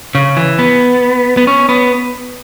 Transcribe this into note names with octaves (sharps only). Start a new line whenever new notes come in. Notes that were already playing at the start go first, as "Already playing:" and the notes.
C#3
E3
B3
B3
C#4
B3